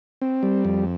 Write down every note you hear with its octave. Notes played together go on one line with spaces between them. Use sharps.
C4
G3
F2